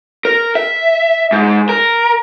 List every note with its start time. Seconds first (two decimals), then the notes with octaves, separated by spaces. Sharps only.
0.25 A#4
0.55 E5
1.32 G#2
1.69 A#4